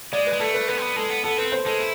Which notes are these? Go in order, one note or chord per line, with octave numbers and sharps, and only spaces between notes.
G#3 D5
B4
G#3
A3 A4
B4
B3 B4
C4
B3
G#3 A4
B3
B3 A4
C4 B4
C5
G#3 A4
E4